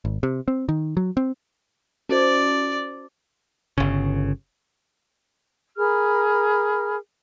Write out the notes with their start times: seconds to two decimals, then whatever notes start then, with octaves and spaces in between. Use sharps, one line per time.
0.05 G#1
0.23 C3
0.48 C4
0.69 D#3
0.97 F#3
1.17 C4
2.09 C#4 F#4 C5 D5
3.78 G1 C#3
5.77 G#4 A#4 B5 F6